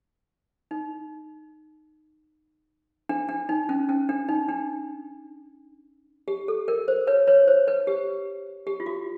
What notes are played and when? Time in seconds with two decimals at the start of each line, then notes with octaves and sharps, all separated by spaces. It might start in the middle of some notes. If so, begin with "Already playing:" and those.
0.71 D#4
3.09 D4
3.29 D4
3.49 D#4
3.69 C#4
3.89 C#4
4.09 D4
4.28 D#4
4.49 D4
6.28 G4
6.48 A4
6.68 A#4
6.88 C5
7.07 B4 C#5
7.27 B4 C#5
7.48 C5
7.68 B4
7.87 G4
8.67 G4
8.80 F4
8.86 F#4